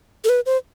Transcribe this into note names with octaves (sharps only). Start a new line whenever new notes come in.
A4
B4
C5